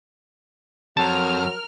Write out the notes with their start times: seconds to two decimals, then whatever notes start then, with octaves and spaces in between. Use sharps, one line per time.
0.97 F2 F#3 A#4 A5 F6